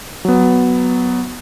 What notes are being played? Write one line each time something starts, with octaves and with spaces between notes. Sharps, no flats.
F#3 B3